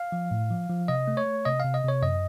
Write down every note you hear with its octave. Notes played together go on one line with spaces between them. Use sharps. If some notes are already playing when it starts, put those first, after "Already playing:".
Already playing: F5
F3
A2
F3
F3
C3 D#5
A3
C#5
A3
C3 D#5
F5
C3
D#5
C3 C#5
F#2 D#5